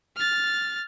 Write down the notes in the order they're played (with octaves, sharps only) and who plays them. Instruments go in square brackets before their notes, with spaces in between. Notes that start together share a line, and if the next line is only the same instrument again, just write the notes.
[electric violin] F6 A6